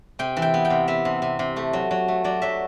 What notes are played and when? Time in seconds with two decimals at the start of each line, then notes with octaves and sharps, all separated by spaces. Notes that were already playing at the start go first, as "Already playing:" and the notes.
0.19 C3 G5
0.37 E3
0.42 G5
0.54 B3
0.65 G5
0.70 C3
0.88 B3 E5
1.05 C3
1.22 C3
1.39 C3
1.56 A3
1.73 F#3
1.91 F#3
2.08 A3
2.24 F#3 D5
2.42 F#3 E5